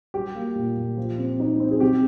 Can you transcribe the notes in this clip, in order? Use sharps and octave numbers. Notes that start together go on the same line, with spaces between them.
G3 G4
A#3
A#2
A#2
F3
C4
D#4
C4
G#4
C3 G4